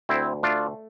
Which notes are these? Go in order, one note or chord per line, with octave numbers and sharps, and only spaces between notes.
D2 C4 E4
A3 D4 F4